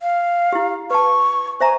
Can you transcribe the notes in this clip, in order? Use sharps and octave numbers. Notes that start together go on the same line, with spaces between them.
F5
E4 G4
B4 A5 C#6
C5 E5 G#5 A#5